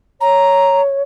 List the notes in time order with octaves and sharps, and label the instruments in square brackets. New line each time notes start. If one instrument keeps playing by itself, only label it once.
[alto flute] C#5 [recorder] A#5